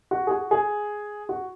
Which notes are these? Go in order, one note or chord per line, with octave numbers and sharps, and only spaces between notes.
F#4
G#4
F#4
G#4
F#4